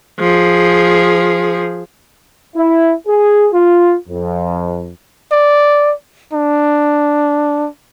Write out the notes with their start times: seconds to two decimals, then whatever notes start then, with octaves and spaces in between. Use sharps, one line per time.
0.20 F3 G#4
2.56 E4
3.08 G#4
3.53 F4
4.09 F2
5.32 D5
6.33 D4